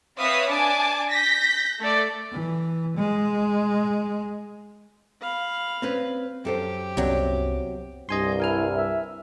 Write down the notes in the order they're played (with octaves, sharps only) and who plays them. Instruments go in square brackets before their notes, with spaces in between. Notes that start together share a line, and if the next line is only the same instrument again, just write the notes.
[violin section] C4 B4 C#5 E5 F5 D#6
D4 G#5 A5 D6
G6 A#6 B6
A3 A4 D5
[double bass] E3
G#3
[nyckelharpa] F5 B5
[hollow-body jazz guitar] C4 C#4 B4
[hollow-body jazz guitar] F#2 A4 C5 [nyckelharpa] G4
[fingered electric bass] C2 B3 C#4 [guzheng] C3 F#3
[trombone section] C2 G2 [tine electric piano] D#5 G#5 C6
[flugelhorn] E4 [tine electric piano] A#4 G#5 F6
[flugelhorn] E5